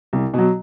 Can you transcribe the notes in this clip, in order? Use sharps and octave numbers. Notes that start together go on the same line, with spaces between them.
C2
B2 F#3